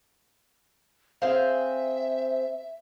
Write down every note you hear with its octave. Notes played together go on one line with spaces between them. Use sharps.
C4 G#4 C5 E5 F5